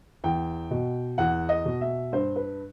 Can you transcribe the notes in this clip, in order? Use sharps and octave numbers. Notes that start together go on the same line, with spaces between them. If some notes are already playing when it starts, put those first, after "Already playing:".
E2 G5
B2
E2 F#5
D#5
B2
E5
G2 C5
B4